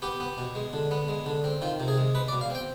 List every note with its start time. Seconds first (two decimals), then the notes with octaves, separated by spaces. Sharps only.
0.02 B3 G4
0.20 B3
0.38 B2
0.55 G#3
0.73 D3
0.91 B3
1.08 G#3
1.26 D3
1.44 C4
1.61 D#3 F4
1.80 C3
1.88 G#4
1.98 G#3
2.15 G#3 B4
2.28 D5
2.32 B2
2.41 F5
2.50 C4 G5